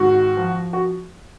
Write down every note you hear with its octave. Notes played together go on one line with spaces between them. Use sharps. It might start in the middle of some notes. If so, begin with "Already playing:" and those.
Already playing: G#2 D#3 F#4
F3
F#4